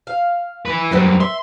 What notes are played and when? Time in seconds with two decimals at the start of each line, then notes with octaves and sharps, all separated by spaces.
0.07 F5
0.66 E4 B4
0.91 F#2 G3 C4 A#4 B4
1.20 E5 C6